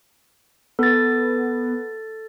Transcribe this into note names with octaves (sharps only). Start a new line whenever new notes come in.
B3 A4 A6